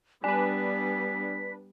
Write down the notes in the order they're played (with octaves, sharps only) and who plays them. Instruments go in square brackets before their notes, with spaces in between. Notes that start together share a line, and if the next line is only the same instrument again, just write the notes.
[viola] G3 B3 [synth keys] D4 B4 [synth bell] G#5 [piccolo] B6